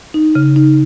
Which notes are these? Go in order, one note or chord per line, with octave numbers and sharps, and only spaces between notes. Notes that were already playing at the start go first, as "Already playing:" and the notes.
D#4
C#3
D#4